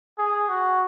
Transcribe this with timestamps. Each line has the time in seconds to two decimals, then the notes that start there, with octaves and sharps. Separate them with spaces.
0.18 G#4
0.49 F#4